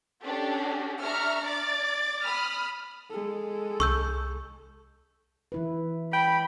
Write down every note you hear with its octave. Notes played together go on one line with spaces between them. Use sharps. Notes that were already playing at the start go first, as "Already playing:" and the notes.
C#4 D4 G4 A4
D4 E5 A#5 C#6 F6
D5 D6 A6
B5 D#6 F6
G#3 A4
C2 C#6 E6 G6
E3 E4 B4
G5 B5